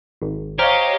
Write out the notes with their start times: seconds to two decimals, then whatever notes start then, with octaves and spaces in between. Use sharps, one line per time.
0.22 G#1
0.59 G4 C5 C#5 D#5 F5 A#5 F6